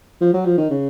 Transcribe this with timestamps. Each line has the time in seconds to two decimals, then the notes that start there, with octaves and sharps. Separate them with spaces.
0.21 F3
0.33 F#3
0.45 F3
0.57 D#3
0.70 C#3